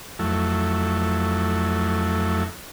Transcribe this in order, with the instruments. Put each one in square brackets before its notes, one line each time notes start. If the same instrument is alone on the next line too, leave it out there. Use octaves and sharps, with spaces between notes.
[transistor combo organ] F2 F#3 A3 E4